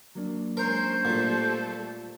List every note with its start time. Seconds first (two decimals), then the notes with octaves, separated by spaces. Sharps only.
0.15 F#3 A#3 D4
0.57 G#3 C#4 A#4 C5 C7
1.05 A#2 G3 A3 A4